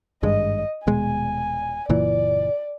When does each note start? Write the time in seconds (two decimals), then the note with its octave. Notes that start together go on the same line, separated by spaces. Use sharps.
0.23 G#1 G2 G#3 D#5
0.87 D#1 B2 G#3 G#5
1.89 F#1 A#2 E3 D5